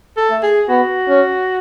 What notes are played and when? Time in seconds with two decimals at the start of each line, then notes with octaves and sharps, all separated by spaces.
0.17 A4
0.30 A3
0.43 G#4
0.69 B3 F#4
1.08 C#4